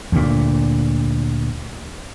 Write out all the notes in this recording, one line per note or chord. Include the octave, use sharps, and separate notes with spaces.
D2 A#2